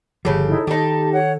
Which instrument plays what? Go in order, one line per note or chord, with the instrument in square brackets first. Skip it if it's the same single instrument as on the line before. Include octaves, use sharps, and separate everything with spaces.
[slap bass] G1 F3 [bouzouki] C#3 G4 [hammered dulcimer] A4
[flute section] D#4 E4
[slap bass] D#3 [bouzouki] D#4 G4 [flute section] A5
[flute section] C#5 F#5